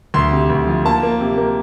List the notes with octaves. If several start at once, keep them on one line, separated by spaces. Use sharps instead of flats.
D2 C6
C3
D2
F3
A#3 A5
A#3
C3
A#3